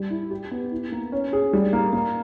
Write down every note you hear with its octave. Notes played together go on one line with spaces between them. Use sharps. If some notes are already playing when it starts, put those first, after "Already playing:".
Already playing: G3
E4
G4
B3
E4
A#3
C#4
G#4
G3
A#3
A#3